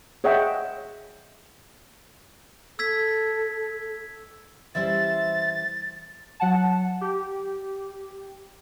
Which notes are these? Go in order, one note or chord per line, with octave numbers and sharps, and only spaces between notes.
G#4 C#5 D#5 E5 F#5 G5
A4 E6 G#6 B6
E3 G3 C#4 E4 C5 E5 A6
F#3 F#5 A5
G4